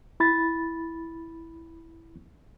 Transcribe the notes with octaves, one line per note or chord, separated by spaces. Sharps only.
E4 B5 A6